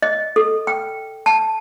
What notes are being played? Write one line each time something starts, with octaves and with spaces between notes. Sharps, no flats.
D#5
A4
G5
A5